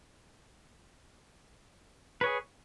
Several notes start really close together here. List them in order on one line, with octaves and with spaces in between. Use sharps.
B4 C#5 G#4